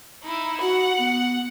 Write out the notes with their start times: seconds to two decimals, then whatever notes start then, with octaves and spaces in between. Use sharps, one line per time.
0.23 D#4 E4
0.61 F#4 F#5
0.99 B3